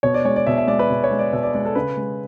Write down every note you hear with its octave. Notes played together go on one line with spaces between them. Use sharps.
B2 C#5
D5
G#3 C#5
D5
B2 E5
E5
G#3 D5
B4
B2
C#5
G#3
D5
B2 E5
D5
G#3 D5
A4
C#3 B4
G#3